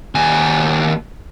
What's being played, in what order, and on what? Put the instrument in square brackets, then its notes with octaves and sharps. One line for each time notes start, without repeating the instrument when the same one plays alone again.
[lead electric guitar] D#2 G#5